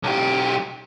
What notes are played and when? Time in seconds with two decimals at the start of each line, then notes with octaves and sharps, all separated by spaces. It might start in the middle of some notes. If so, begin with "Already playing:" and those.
0.03 B1 G4